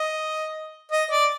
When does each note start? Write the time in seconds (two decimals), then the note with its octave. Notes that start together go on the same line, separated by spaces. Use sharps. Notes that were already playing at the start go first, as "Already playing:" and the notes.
Already playing: D#5
0.92 D#5
1.11 D5